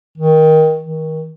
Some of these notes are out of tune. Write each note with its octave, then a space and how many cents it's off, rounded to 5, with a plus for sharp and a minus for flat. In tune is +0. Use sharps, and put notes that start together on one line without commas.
D#3 +20
D#3 +25